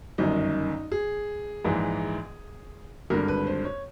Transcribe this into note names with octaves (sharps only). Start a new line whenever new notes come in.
G1 F#2 D#3 D#4
G#4
A#1 G#2 E3
G#1 G2 D3 A#4
B4
C5
C#5